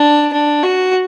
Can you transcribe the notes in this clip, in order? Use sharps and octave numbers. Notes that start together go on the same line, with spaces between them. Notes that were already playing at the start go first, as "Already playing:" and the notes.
Already playing: D4
D4
F#4